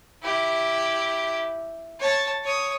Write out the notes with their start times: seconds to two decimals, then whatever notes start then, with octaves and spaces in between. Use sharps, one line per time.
0.23 E4 G4
2.00 C#5 A5
2.44 C#5 D#6